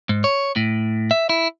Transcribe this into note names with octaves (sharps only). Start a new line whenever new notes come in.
G#2
C#5
A2
E5
E4